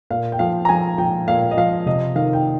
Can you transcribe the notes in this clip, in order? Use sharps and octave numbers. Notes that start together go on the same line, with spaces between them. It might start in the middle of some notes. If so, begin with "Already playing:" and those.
A#2 F5
G5
F3 F5
A#5
F3 G#5
F3 G5
A#2 F5
D#5
F3 F5
C3 D#5
D#3 F5
G5